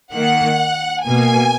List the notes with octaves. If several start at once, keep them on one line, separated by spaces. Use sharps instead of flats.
D#3 A#3 F#5
B2 A#3 G#5